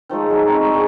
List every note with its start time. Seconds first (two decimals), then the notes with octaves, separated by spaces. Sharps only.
0.09 D#3 F3 G#3 A3
0.30 F#3 D#4
0.48 C4 C#4
0.61 G#3 D#4 C#5 D5
0.74 D3 D#3